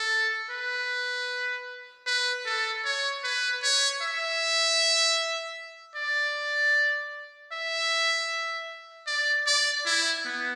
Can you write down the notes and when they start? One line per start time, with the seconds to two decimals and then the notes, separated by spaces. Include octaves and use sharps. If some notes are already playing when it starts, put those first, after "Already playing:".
Already playing: A4
0.51 B4
2.07 B4
2.46 A4
2.85 C#5
3.23 B4
3.63 C#5
4.02 E5
5.96 D5
7.52 E5
9.07 D5
9.46 D5
9.86 E4
10.25 B3